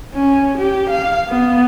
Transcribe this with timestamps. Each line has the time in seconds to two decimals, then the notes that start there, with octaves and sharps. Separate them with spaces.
0.14 C#4
0.58 G4
0.90 F5
1.29 B3